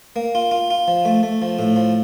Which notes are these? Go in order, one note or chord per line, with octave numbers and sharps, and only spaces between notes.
A#3
F4
F4
F4
F3
A3
A3
F3
A2
F3